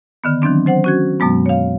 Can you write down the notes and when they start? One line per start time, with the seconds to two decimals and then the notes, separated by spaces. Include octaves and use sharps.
0.24 D3 D#3 B3
0.42 D#3 E3 F#3 C4 D4
0.66 F#3 C5 F#5
0.84 C#4 F#4 G#6
1.20 F#2 B2 F#3 G#3 B3
1.46 C#5 F5